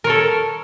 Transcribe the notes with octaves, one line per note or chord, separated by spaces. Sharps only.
A4 A#4 C#5